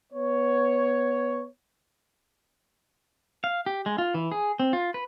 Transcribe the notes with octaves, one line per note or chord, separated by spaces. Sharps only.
B3 C#5
F5
G4
G#3
F4
E3
G#4
C4
F4
B4